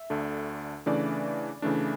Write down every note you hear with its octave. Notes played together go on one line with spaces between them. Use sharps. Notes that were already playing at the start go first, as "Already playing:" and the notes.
Already playing: E5
D2 D3 A3 D4
C#3 E3 A3 D4 D5
C#3 E3 A3 D4